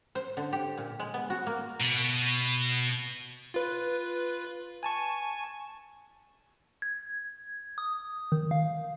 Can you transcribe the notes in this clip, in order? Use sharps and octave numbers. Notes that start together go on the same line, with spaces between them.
C5
D3
G4
A#2
G#3
B3
F#4
A#3
B2
F4 B4
G#5 A5 C#6
G#6
D#6
D#3
F5